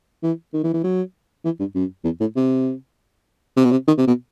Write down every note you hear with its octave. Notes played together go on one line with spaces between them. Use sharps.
E3
D#3
E3
E3
F#3
E3
G2
F#2
E2
A2
C3
C3
B2
C3
D#3
C3
B2